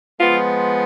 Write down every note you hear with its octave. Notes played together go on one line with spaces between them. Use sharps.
F3 G#3 B3 F4